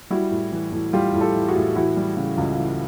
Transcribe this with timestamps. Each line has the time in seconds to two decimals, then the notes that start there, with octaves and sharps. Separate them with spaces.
0.10 G3 E4 F#4
0.31 A2
0.52 E3
0.72 A2
0.93 G3 F4 G4
1.14 A2
1.21 G4 A4
1.35 E3
1.48 F#4 G#4
1.56 A2
1.75 E3 E4 F#4
1.96 G3
2.17 C#3
2.38 C#2
2.58 E3